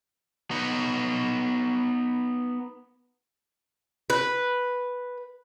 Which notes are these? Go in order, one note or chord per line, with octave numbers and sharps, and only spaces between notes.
B3 D#4
B4